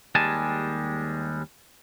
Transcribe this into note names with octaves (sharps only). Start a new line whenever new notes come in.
D#2 G3 G#3 G#5 A5